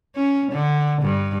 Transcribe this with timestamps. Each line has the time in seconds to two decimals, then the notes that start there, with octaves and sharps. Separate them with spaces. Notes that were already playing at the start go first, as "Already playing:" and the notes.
0.16 C#4
0.52 D3
1.02 G2